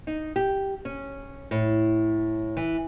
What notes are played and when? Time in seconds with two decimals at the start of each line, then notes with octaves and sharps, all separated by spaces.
0.07 D#4
0.36 G4
0.85 C#4
1.51 A2
2.57 E3